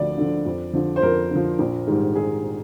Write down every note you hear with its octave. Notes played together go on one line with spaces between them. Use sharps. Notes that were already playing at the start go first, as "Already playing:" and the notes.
Already playing: D2 D3 F3 D5
D3 F3
F2
D3 F3
C5
F2 A#4
D3 F3
A#1
G#2 D#3 G3
G#4